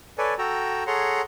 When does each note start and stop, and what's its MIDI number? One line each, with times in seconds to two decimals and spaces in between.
0.18 0.34 69
0.18 0.34 71
0.18 0.34 73
0.18 0.34 74
0.18 0.34 80
0.38 0.83 66
0.38 0.83 69
0.38 0.83 79
0.38 0.83 82
0.38 0.83 88
0.87 1.21 68
0.87 1.21 69
0.87 1.21 73
0.87 1.21 78
0.87 1.21 82
0.87 1.21 84